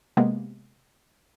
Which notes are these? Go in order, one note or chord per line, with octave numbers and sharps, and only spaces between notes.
C3 G#3 A#3 B3